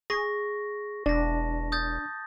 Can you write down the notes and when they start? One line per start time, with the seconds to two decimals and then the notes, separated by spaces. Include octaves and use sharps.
0.10 G#4 C#6 A#6
1.06 E1 D4 A5 A#6
1.72 D#6 G6 A6